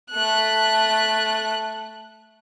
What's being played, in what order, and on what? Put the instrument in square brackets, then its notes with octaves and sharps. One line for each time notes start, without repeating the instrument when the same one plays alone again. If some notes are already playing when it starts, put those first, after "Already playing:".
[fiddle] A3 F#6